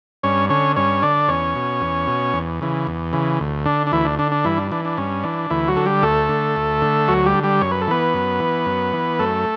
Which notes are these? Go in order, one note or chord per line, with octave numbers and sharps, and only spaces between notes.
G2 C#4 C#5
D3 C#4 C#5
G2 C#4 C#5
D3 D4 D5
E2 C#4 C#5
B2
E2
B2
E2
C#3 E3
E2
C#3 E3
D2
D3 D4
D4
D2 E3 E4
D4
D3 D4
D4
G2 E3 E4
D4
E3 D4
D4
G2 C#4
E3 D4
D2 E3 E4
F#3 F#4
D3 A4
G3 G4
D2 A3 A4
D3
D2
D3
D2 F#3 F#4
G3 G4
D3
G3 G4
F#2 C#5
B4
A4
E3 B3 B4
F#2
E3
F#2
E3
F#2 A3 A4